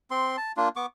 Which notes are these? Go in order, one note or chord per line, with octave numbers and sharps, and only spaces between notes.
C4 C6
A5
A#3 D4 F4
B3 C#6 D6